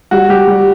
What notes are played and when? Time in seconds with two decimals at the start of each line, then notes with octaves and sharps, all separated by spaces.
0.11 G3 F#4
0.29 G3 G4
0.47 G3